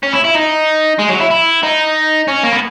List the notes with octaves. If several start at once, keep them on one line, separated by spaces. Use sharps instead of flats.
C#4
E4
E4
D#4
G#3
F#3
E4
E4
D#4
C#4
A#3
B3